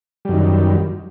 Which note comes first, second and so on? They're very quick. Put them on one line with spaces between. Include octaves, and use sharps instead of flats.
G3 F#2 D#3